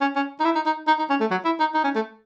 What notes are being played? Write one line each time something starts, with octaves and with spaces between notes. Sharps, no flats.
C#4
C#4
D#4
E4
D#4
D#4
D#4
D#4
C#4
A3
F#3
E4
D#4
D#4
C#4
A3